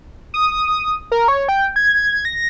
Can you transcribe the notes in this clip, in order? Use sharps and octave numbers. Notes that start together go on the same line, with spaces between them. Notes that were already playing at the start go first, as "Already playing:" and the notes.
D#6
A#4
C#5
G5
G#6
A#6